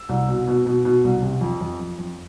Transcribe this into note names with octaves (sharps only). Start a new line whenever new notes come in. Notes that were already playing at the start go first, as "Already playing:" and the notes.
Already playing: E6
C2
B2
B2
B2
B2
C2
C3
F2
F2
F2
F2